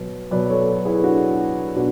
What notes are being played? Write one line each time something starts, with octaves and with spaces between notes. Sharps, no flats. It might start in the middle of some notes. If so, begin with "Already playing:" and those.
Already playing: B2 F#3
B2 F#3 B4 D5
A4 C#5
E4 G#4
D4 F#4
B2 D4 F#4